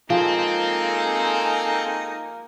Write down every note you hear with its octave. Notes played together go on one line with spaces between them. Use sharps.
F3 G#3 A#3 C4 D#4 G#4 A4